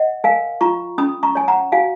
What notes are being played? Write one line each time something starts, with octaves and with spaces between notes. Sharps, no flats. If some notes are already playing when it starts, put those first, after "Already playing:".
Already playing: D#5 F#5
A#4 F5 G#5
F4 A#5 C#6
C#4 B5 D#6
A#5 C#6
C#5 G#5
F#5 A#5
F#4 F5 G#5